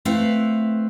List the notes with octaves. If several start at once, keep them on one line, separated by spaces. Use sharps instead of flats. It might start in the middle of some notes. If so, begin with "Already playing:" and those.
A3 C4 E4 B4 F5